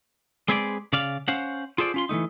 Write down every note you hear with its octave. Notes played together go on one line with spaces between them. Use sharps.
G#3 C4 G#4 B4 C#5 D5
C#3 D5 F5
C#4 C5 F5 F#5
F4 G#4 A4 C5 D5
C#4 F4 C6
E3 G#3 A3 D#4